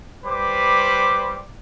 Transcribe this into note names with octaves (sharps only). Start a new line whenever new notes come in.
G3 B4 C5 B5 D6